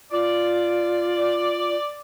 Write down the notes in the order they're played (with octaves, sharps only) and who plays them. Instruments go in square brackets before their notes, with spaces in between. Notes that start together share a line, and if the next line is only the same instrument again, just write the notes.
[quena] F4 [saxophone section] D5